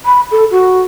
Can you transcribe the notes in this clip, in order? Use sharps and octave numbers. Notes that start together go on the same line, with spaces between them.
B5
A4
F#4